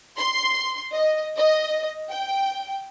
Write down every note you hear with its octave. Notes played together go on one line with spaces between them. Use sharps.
C6
D#5
D#5
G5